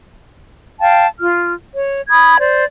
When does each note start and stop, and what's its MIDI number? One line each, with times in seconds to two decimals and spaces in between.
0.81 1.06 77
0.81 1.06 79
0.81 1.06 81
1.20 1.53 65
1.20 1.53 89
1.75 2.02 73
2.10 2.37 83
2.10 2.37 87
2.10 2.37 92
2.39 2.65 72
2.39 2.65 74